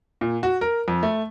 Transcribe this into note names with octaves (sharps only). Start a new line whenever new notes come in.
A#2
F#4
A#4
F2
A3